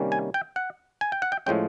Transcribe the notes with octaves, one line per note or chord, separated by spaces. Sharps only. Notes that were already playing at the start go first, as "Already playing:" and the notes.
Already playing: C3 D#3 G3 A#3 C#4
G#5
G5
F#5
G#5
G5
F#5
G5
A2 F3 G#3 C#4 G5